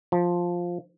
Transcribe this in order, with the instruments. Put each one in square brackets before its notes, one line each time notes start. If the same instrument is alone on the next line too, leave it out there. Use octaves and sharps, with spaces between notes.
[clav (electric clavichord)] F3